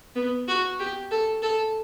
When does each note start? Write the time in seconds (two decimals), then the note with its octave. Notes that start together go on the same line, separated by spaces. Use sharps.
0.15 B3
0.48 F#4
0.79 G4
1.11 A4
1.42 A4